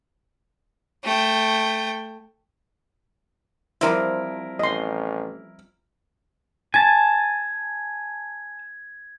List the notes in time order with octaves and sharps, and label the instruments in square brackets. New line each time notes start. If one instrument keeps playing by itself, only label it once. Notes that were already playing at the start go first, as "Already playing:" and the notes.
[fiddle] A3 G5
[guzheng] F3 G3 C4 [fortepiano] E4 A#4
[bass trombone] A1 [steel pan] D#5 C6
[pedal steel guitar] G#5 A5 [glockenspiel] G#6